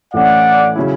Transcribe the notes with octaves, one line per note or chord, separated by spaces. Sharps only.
A2 E3 A3 C#4 D5 F#5
C#3 F#3 C#4 E4